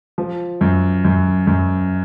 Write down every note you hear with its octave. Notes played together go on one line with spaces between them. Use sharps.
F3
F#2
F#2
F#2